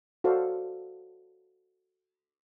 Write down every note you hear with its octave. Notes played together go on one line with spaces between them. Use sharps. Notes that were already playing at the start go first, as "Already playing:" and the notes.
F#4 A4 C5 D5 F5